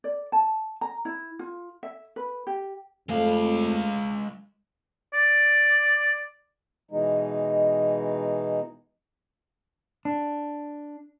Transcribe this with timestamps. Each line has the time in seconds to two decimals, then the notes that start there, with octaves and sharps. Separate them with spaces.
0.04 D5
0.32 A5
0.81 A#5
1.05 E4
1.39 F4
1.83 E5
2.16 B4
2.47 G4
3.09 F2 G#3 A3 F5
5.13 D5
6.91 B2 E3 G#3 D#4
10.05 D4